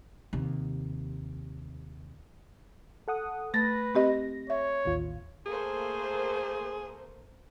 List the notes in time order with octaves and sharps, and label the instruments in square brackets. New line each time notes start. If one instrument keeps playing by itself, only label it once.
[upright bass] D#2 C3
[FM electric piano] A4 F#5 D#6
[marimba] A3 A6 [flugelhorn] B4 [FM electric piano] A#6
[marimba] C4 G4 D#5
[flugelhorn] C#5 [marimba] E5
[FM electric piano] A1 D#2 F4
[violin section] A3 A#3 C5 [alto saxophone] G#4